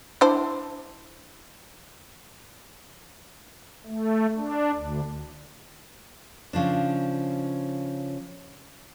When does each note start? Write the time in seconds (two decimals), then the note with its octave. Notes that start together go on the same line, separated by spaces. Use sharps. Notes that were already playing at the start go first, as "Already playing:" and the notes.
0.21 D4 E4 C5
3.86 A3
4.38 D4
4.75 D2
6.53 C#3 F3 D4